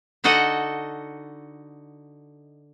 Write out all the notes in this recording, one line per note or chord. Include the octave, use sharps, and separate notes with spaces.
D3 D#4 F#4 A4 D#5 F#5